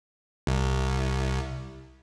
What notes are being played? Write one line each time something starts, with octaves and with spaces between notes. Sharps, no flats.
C2